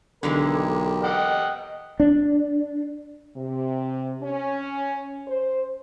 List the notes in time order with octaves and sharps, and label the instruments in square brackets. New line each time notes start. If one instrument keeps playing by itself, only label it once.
[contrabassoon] B1 [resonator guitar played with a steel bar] D3 E3 G#3 [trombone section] G4 A#4
[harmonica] D#5 F#5 G5
[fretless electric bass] D4
[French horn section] C3
C#4
C5